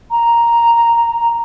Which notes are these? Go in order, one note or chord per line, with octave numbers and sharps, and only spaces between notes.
A#5